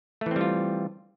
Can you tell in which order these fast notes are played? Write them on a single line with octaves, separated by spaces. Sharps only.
A3 E3 C4 G3 F4